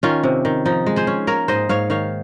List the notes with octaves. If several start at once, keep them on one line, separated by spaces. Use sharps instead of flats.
D#3 C#4 F4
C3
D#3
F3 D#4
G#3
G#4 C5
C#4
A#3 A#4 C#5
G#2 C5 D#5
G#2 C#5 F5
D#3 C#5 F5